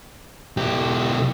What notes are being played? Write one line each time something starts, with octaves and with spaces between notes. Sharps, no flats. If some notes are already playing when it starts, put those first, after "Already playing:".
B1 G4